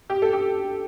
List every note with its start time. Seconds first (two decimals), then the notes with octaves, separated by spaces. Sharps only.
0.10 G4
0.22 A4
0.33 G4